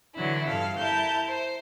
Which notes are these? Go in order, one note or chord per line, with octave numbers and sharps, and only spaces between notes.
D3 E3 F#3 E4
G2 A4 F5
E4 A#4 A5 G6
C5